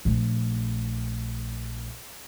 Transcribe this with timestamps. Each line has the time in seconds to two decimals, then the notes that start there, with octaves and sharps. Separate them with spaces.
0.05 A#1 A3